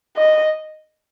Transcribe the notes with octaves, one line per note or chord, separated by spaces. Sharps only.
D#5